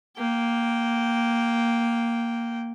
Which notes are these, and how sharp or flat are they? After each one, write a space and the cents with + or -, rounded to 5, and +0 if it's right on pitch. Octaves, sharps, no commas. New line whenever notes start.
A#3 +0 G5 -10